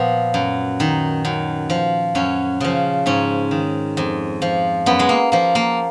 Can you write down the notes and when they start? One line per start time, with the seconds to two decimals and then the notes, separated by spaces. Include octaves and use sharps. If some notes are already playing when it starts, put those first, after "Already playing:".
Already playing: A#2 F3 B3
0.34 F#2
0.80 D#3
1.25 F#2
1.70 F3
2.15 F#2 C#4
2.60 C#3 F3
3.06 G#2 C#4
3.51 D#3
3.97 F2
4.42 F3
4.86 F#2 B3
4.99 G#3
5.09 A#3
5.32 F3 A#3
5.55 A#3